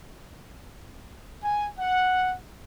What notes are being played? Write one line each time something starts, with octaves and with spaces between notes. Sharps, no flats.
G#5
F#5